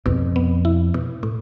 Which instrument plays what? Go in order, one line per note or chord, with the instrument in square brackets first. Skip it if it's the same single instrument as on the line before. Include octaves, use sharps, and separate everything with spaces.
[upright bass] F2 [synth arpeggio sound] B2
[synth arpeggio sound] B3
E4
B2
A2